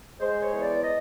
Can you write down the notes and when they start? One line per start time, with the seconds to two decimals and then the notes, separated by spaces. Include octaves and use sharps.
0.20 G#3 C5
0.41 C#5
0.52 E2
0.62 D5
0.84 D#5